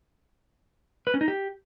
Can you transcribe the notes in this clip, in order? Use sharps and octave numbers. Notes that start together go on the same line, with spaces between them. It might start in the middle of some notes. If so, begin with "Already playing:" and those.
B4
C#4
D#4
G4